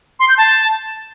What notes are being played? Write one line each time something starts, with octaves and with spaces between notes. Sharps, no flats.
C6
G6
A5